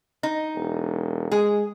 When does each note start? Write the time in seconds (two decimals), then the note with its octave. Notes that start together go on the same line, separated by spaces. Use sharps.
0.23 D#4
0.55 E1
1.32 G#3 G#4